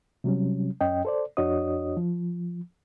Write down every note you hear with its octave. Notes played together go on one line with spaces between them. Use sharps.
C3 F#3 G3 C#4
F#2 C#4 D#5 G5
A4 C5 D5
F2 D4 F#4 C#5 D#5 D#6
F3